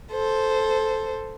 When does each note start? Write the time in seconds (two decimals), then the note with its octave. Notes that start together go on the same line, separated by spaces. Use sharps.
0.11 A4 C5